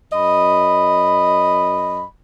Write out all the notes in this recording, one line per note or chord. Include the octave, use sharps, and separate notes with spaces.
F#2 D#5 B5